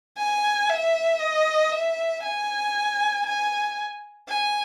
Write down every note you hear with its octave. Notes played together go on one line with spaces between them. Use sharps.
G#5
E5
D#5
E5
G#5
G#5
G#5